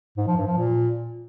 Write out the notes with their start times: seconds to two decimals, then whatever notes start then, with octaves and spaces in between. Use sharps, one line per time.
0.17 G#2
0.27 F3
0.37 G2
0.47 F3
0.57 A#2